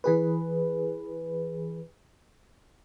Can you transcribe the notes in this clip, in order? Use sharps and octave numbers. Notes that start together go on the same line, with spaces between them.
E3 G#4 B4